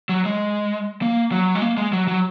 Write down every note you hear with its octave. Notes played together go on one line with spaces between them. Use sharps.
F#3
G#3
A#3
F#3
G#3
A#3
G#3
F#3
F#3